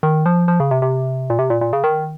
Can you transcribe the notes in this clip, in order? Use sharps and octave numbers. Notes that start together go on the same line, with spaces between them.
D#3
F3
F3
C#3
C3
C3
A#2
C3
A#2
A#2
C#3
D#3